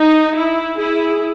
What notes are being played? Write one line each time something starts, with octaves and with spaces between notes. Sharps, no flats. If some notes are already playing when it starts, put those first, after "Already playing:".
Already playing: D#4
E4
E4 G#4